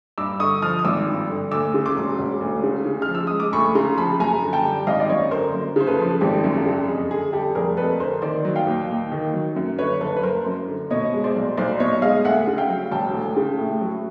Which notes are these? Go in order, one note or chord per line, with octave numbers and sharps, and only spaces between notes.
G2 D6 E6
D3 C#6 D#6
F3 D#6 F6
D#6
G#1 D6 E6
G2
D3
D2 D6 E6
C#3
C6 D6
E1
E1
D2
C#3
C#3
F6
F3
E6
G#3 D#6
D6
D2 B5 C#6
C#3 A#5 C6
F3 A5 B5
F#2 G#5 A#5
D3
G5 A5
G3
G#1 D#5 F5
D5
F#2 C#5 D#5
D3 A#4 C5
F#2
C#3 C5
A4 B4
F3
G#1 G4 A4
F#2
G4 A4
C#3
F2 G#4
D3 G#4
G3 G4 A4
F1 G#4 A#4
F2 A4 B4
D3 A#4 C5
D#3 C5 D5
F#3
F5 G5
D#2
D#2
D#3
F#3
F#2
D3 B4 C#5
F#1 A4 B4
B4
F#1 A#4 C5
F#2
D3
B2 C#5 D#5
G#3
C5 D5
B1
B1 C5 D5
B2 C#5 D#5
G#3 D#5 F5
D2 E5 F#5
C#3
F5 G5
F#3
E1 G5 A5
D2
C#3
A2
F#3